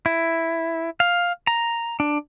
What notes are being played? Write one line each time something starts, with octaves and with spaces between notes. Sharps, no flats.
E4
F5
A#5
D4